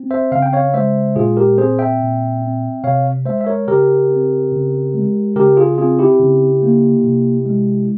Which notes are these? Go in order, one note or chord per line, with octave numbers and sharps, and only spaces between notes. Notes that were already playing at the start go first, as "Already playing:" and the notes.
Already playing: C4
C5 E5
C#3 F5
G5
C#5 F5
G#3 C5 E5
A#2 F4 G#4
G4 A#4
C4 G#4 C5
E5 G5
A#2
C4
C3 C#5 F5
G#3 C5 E5
E5
A#4 C#5
C#3 G4 A#4
C4
C#3
G#3
C#3 G4 A#4
F4 G#4
C4 F4 G#4
E4 G4
C#3
A#3
C3
G#3